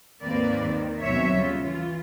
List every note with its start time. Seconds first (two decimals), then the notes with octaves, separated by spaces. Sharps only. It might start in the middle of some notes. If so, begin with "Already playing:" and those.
0.22 D#2 G#2 A#3 C4 B4 D5
0.66 D#3
1.02 D#2 B2 F#3 C4 C#5 E5
1.35 C#3 G3 F4
1.64 E3 F4